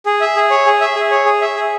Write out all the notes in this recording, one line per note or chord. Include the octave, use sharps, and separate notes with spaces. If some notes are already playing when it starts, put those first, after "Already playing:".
G#4
E5
G#4
C#5
G#4
E5
G#4
C#5
G#4
E5
G#4